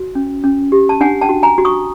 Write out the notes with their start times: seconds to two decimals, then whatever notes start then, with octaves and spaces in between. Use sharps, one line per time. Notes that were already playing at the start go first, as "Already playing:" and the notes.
Already playing: F#4
0.15 C#4
0.44 C#4
0.72 G4
0.89 A5
1.01 D4 F#5 G#5
1.21 G5 A5
1.29 F#4
1.43 G#5 A#5
1.58 F#4
1.65 C#6 D#6